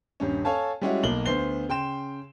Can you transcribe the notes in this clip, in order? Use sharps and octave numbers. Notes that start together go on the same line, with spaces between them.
D#1 G2 C#4
A4 C#5 F5 G#5 A5
G3 G#3 C#4 E4 F#4
B1 A#3 F#7 G7
D2 B3 C5 C7 G7
C#3 G5 C6 E7